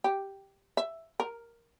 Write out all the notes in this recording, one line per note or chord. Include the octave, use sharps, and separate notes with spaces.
G4
E5
A#4